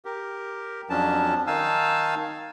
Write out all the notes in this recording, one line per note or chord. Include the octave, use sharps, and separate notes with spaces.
G4 A#4
F2 F3 F#3 C#4 D4 A5
D#3 D#4 F5 G#5 A5 E6